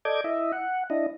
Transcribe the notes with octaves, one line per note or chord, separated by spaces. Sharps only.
A4 D5 D#5 D6 G6 G#6
E4 D#5 E5
F#5
D4 E4 D#5